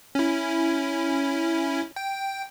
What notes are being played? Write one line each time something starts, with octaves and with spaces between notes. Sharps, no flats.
C#4 E4
G5